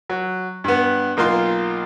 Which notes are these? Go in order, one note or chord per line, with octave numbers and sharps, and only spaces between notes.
F#3
G2 B3
B1 A#3 F4 C6